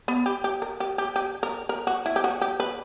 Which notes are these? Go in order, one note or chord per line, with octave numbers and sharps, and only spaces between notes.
B3
G4
G4
A#4
G4
G4
G4
A#4
A#4
F#4
E4
G4
F#4
G4
B4